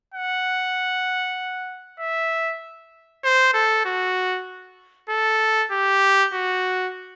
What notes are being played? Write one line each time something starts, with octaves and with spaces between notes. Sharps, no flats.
F#5
E5
C5
A4
F#4
A4
G4
F#4